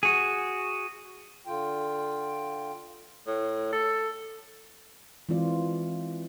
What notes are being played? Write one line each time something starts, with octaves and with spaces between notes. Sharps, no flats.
F#4 G#4
D3 F4 G5
A2
A4
E3 G#3 C4 F4 D5